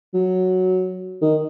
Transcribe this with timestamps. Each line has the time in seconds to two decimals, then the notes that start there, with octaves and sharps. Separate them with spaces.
0.14 F#3
1.22 D#3